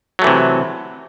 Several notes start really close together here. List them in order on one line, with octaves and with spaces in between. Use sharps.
F#3 A3 E3 C3